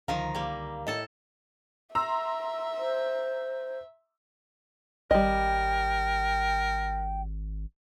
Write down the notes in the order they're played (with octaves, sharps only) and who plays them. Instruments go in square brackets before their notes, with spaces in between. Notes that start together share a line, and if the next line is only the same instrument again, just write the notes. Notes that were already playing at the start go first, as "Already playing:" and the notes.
[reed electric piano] C#2 D3 F5 [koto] D#3 F3 A#4
[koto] G3 A#3
[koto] A2 A4 A5 [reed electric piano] D#5
[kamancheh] E5 [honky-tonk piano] A#5 C6 E6
[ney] C5
[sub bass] G#1 [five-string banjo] G3 D#5 [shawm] A#4 [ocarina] G5